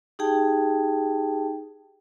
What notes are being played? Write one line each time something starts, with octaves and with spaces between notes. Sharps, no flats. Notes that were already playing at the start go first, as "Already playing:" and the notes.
D#4 G4 G#4 G5 A5